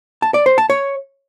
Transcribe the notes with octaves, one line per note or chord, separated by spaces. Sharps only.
A5
D5
C5
A5
C#5